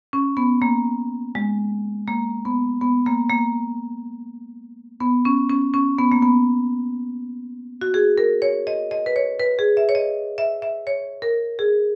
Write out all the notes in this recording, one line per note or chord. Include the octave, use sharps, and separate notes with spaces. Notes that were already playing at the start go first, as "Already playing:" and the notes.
C#4
B3
A#3
G#3
A#3
B3
B3
A#3
A#3
B3
C#4
C#4
C#4
B3
A#3
B3
F#4
G#4
A#4
C#5
D#5
D#5
B4
C#5
B4
G#4
E5
C#5
D#5
E5
E5
C#5
A#4
G#4